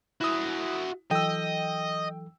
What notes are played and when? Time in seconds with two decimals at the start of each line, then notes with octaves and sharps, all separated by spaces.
0.21 E4 F#4 E5 D#6
1.11 E3 F#3 A4 D#5 G5 E6